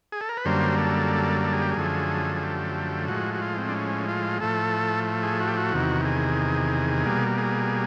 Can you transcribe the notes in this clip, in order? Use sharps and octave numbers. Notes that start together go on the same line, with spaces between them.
G#4
A4
A#4
B4
F#2 D3 G3 A#3 C5
A4
A4
G#4
G4
G#4
F#2 D3 F3 A3
G#4
G4
A2 F3 G#3 F#4
F#4
F4
C4
D4
C#4
F4
A2 F3 A3 A4
G#4
F#4
G4
F#4
E2 C3 D#3
G#4
B2 G3 A#3
G#4